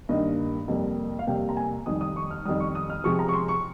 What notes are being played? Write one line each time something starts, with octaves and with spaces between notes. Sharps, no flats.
G2 D#3 A#3 D#5
F2 C3 G3 A#3
F5
F2 C3 G3 A#3 G5
A#5
G#5
F2 D#3 G3 D#6
D#6
C#6
F6
F2 D#3 G3 D#6
C#6
D#6
F6
C3 F3 G#3 C#6
A#5
C#6
C6
C#6